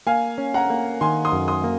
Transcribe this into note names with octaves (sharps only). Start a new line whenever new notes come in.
A#3 F5 G#5
C#4
F#5 A#5
A#3
D#3 G#5 C6
C6 D#6
F#2
C6 D#6
A#3